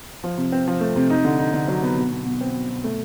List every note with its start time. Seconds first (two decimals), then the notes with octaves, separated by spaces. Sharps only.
0.24 F3
0.38 C3
0.52 C4
0.68 F3
0.81 A3
0.96 C3
1.10 D#4
1.25 D3
1.39 D#4
1.54 D3
1.68 F#3
1.83 B3
1.97 B2
2.12 B2
2.26 B2
2.41 C4
2.55 B2
2.69 B2
2.84 A3